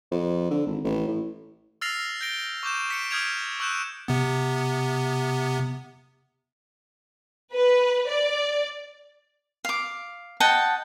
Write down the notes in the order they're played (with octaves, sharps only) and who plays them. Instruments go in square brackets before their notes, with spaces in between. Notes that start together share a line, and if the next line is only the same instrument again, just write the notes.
[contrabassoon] F2
D3
G#1
A1
A2
[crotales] E6 F6 A6 A#6 C7 F7
G6 A6 A#6 D7 G7
C#6 D6 G6 E7
B6 C#7 D7
D#6 F6 G6 G#6 D7 F7
C#6 E6 F#6 G6 E7
[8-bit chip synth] C3 B3
[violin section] B4
D5
[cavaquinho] F5 D6
D#5 F#5 G5 A5